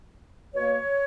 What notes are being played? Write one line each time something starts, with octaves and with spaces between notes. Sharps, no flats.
B2 A#3 C#5